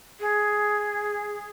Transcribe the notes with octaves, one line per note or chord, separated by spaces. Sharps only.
G#4